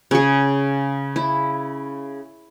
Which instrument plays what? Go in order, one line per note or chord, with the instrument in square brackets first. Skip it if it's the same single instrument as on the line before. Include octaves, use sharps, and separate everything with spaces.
[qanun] C#3 G#4
E4